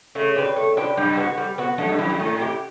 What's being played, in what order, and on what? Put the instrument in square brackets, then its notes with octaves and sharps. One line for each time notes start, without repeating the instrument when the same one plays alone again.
[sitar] C#3 [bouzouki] A3
[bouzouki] D4 G4 B4
A3
D4 G4 B4
[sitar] G2 [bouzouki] G3
[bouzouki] B3 F#4
G3
B3 F#4
[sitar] F#2 [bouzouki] A3
[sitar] G2
[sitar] F#2 [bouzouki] E4
[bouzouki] G4
[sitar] F#2
[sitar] A2 [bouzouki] A3
[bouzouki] E4 G4